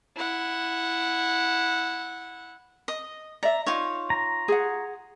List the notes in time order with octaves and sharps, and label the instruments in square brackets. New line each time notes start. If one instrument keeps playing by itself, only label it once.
[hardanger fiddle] E4 F#5
[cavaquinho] D#5
[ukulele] D5 E5 [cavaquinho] A#5
[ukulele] D#4 [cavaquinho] F4 C#5
[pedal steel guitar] A#5
[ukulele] G#4 F#5